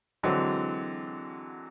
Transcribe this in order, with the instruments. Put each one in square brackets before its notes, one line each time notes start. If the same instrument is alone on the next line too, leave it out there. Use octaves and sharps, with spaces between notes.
[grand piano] D3 E3 F#3 G#3 C4